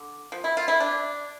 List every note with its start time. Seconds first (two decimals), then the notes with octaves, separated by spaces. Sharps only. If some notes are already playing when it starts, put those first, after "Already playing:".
Already playing: D3
0.32 F3
0.44 E4
0.57 F4
0.68 E4
0.80 D4